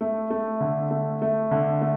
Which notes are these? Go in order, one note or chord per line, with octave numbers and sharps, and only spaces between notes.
A3
A3
D3
A3
A3
D3
A3